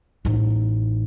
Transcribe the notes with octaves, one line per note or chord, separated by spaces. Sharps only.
A1 D#4